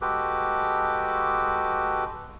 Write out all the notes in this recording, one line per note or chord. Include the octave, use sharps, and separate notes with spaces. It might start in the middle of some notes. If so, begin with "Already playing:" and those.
G#3 F#4 G4 A4 B4 D6